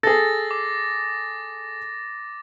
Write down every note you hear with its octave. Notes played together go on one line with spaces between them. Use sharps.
G#4 A4 A6 A#6
D6